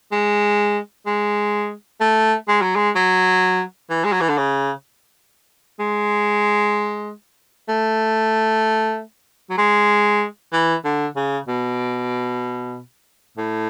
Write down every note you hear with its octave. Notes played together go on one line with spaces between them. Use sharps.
G#3
G#3
A3
G#3
F#3
G#3
F#3
E3
G#3
F#3
E3
D3
C#3
G#3
A3
F#3
G#3
E3
D3
C#3
B2
A2